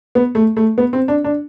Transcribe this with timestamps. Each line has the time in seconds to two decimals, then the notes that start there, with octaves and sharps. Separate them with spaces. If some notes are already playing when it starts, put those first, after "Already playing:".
0.15 B3
0.35 A3
0.57 A3
0.78 B3
0.93 C4
1.08 D4
1.24 D4